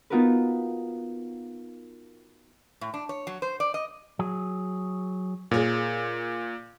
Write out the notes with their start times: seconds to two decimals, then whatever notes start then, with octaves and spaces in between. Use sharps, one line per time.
0.10 B3 D#4 F4 F#4 A#4 B4
2.81 A2
2.94 D4
3.09 C#5
3.27 F#3
3.42 C5
3.60 D5
3.74 D#5
4.19 F#3 G#4
5.51 A#2 G#4 A#4 C#5